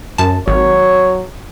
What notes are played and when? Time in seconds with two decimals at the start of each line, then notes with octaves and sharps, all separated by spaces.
0.18 F#2 A5
0.48 G#1 F#3 C#5